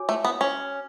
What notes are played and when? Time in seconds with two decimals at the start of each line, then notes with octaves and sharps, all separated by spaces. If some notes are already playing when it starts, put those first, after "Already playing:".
Already playing: F#4 C#5 G#5 D6
0.09 A3
0.25 B3
0.41 C#4